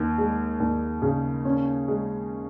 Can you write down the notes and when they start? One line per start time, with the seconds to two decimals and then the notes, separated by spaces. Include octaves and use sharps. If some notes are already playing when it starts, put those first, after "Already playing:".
Already playing: D#2
0.18 G#3
0.60 D#2
1.02 C#3
1.45 C#4
1.88 G#3